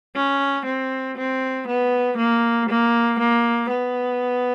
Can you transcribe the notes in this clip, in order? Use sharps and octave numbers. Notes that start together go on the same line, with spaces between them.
C#4
C4
C4
B3
A#3
A#3
A#3
B3